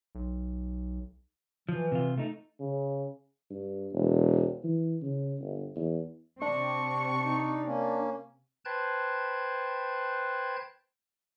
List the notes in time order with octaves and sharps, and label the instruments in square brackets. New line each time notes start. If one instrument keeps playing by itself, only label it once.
[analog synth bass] B1
[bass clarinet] E3 [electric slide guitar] F3
[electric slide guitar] C3 F4
A3 D#4
[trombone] C#3
[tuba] G2
E1
E3
C#3
G1
E2
[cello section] C3 C4 [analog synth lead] D4 [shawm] C#6
[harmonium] D#4
A#3 C#4
[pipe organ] B4 C5 G5 A5 F#6 G#6